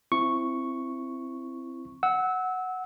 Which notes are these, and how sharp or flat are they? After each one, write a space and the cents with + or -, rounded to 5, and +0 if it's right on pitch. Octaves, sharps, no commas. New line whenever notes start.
C4 +0 E4 +15 C#6 +0
F#5 +0 E6 -25